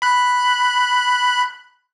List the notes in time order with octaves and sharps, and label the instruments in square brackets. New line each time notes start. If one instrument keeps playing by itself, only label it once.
[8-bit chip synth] B5 F#6